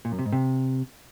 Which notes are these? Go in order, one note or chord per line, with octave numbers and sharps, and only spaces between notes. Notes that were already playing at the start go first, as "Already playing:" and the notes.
A#2
F#2
C3
G#2
C3